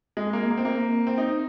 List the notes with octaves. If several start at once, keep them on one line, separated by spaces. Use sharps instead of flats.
G#3
A#3
A#3
C4
A#3
C4
D#4